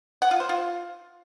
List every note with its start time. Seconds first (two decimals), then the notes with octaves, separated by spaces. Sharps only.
0.22 F#5
0.31 F4
0.40 C5
0.49 F4